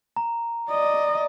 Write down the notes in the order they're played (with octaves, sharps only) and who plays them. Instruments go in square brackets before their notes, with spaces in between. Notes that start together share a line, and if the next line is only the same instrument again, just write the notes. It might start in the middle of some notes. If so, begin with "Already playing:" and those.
[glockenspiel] A#5
[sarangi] D5 [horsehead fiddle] D#5